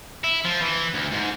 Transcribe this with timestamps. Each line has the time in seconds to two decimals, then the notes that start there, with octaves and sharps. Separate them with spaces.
0.24 E4
0.45 F3
0.62 E3
0.94 D2
1.12 G#2